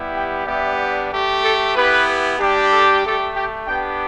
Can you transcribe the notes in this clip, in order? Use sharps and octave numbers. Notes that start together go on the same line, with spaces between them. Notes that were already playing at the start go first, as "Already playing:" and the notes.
Already playing: G3 B3 E4 G4
G5
G3 B3 D4 G4 E5
A3 G4
A4
B3 E4 G4 B4
G3 D4 G4
A4
A3 G4 A4
G4
B3 D4 G4 G5